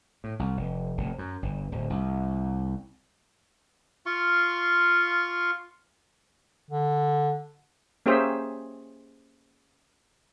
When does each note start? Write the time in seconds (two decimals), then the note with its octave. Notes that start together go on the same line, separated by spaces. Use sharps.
0.24 A2
0.39 C2
0.57 F1
0.97 F1
1.18 F#2
1.42 G1
1.72 D1
1.90 C2
4.06 F4 F5 C6 C#6
6.71 D3
8.06 A#3 C#4 G4 G#4 C5 E5